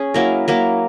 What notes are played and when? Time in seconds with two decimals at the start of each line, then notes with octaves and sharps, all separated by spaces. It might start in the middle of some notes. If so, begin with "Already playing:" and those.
Already playing: C#4 G#4
0.14 F#3 A#3 E4 A#4
0.48 F#3 A#3 E4 A#4